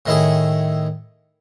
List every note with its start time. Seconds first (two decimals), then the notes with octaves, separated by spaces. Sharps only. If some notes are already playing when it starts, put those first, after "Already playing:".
0.06 A2 D#3 E4 G#4